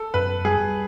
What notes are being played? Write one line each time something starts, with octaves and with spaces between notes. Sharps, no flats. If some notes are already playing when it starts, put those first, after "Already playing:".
Already playing: A4
F#2 B4
G3 G#4